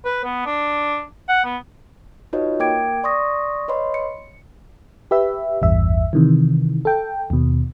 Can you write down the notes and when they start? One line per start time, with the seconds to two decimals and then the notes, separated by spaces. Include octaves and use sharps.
0.05 B4
0.24 B3
0.46 D4
1.29 F#5
1.45 B3
2.33 D#4 F4 F#4 B4 C#5 D#5
2.60 A#3 A#4 G5 D6 G#6 D7
3.04 D5 C6 C#6 D#6 A#6
3.68 B4 C#5 D#5 B5 C6
3.94 C#7
5.11 G4 B4 E5
5.62 A1 E2 G2 E5
6.13 C3 D#3 E3
6.85 A4 G5
7.30 D#2 B2